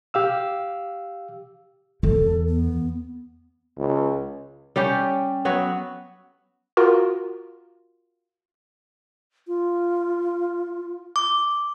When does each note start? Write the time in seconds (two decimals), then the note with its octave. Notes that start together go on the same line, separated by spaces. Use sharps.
0.14 G4 F5 E6
2.03 E2 A4
2.49 B3
3.78 C#2
4.76 G3 C#4 G4
5.45 F#3 B3 F#4
6.77 F4 F#4 A#4
9.48 F4
11.16 D6